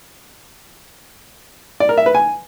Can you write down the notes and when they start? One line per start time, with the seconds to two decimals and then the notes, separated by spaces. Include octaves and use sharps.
1.80 D5
1.89 A#4
1.97 E5
2.06 B4
2.15 G#5